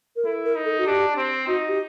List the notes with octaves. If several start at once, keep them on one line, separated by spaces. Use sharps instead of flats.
A#4
E4 A4
A#4
D#4
A4
F#4
D4 G4
C4
D#4 F#4
G4